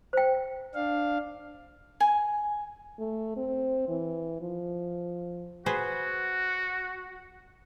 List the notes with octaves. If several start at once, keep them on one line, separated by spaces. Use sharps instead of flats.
C5 G5
D4 F5
G#5
A3
C4
E3
F3
F#4 G#4 B4 C5